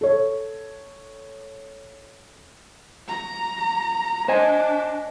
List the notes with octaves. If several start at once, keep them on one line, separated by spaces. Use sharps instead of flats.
A4 C#5
A#5
D4 C5 D#5 G#5